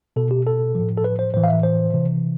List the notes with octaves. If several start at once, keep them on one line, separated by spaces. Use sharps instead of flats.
B2 A4
G4
A4
A2 F3
A4
B4
C5
A2 E3 C5
F5
E5
C5
C3 E3